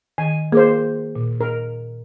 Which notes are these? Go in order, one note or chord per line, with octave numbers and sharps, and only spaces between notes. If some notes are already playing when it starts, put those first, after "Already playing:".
D#3 G#5
A#3 G#4 C5 D6
A#2
A#4